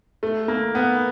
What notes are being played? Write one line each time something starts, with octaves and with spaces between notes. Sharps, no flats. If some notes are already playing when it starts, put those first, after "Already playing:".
A3
A#3
B3